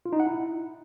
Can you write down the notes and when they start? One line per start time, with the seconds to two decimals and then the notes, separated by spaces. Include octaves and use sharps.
0.06 F4
0.13 D#4
0.20 F#5
0.27 E4